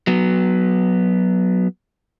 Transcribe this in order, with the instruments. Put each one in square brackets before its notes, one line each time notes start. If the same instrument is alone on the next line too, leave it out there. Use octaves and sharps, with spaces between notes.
[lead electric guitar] F#3 B3